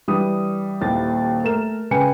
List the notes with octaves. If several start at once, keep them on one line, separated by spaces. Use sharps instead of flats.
E3 G3 D4 D#6
D#1 D#2 E4 A6
A3 A#4 E7
C#3 B4 G5 G#5 C#7